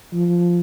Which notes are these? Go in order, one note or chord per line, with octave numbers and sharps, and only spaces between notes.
F3